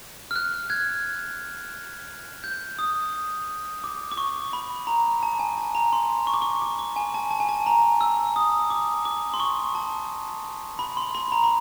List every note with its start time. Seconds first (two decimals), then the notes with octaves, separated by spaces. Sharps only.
0.31 F6
0.36 F#6
0.70 F#6 G#6
2.44 G6
2.79 D#6
3.84 D6
4.11 D6
4.18 C#6
4.53 B5
4.87 A#5
5.23 A5
5.39 G#5
5.58 A5
5.75 A#5
5.93 C6
6.27 C#6
6.34 D6
6.42 C#6
6.62 D6
6.79 D6
6.96 G#5
7.14 A5
7.31 A5
7.40 G#5
7.49 A5
7.66 A#5
8.01 E6
8.36 D#6
8.70 D6
9.05 D6
9.34 C6
9.40 C#6
9.75 A5
10.79 B5
10.97 C6
11.15 B5
11.32 A#5
11.44 B5